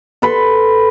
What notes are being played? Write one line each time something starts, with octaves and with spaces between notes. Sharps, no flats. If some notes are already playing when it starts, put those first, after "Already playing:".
A4 B4 C6